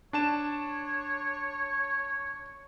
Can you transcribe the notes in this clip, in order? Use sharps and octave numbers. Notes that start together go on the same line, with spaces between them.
D4 C#5 A5 E7